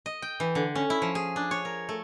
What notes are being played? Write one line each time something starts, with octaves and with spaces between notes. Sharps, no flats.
D#5
G5
E3
D3
C#4
E4
F3
G#4
D4
C#5
A#4
A3